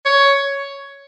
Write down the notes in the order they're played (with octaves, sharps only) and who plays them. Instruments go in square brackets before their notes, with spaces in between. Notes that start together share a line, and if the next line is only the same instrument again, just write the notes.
[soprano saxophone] C#5